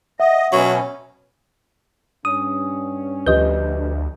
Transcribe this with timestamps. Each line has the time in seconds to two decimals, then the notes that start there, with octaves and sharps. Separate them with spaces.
0.20 D#5 E5 F#5
0.52 B2 F#3 C#4
2.25 G2 C#4 D#6
3.26 D2 F3 G4 B4 D#5 G6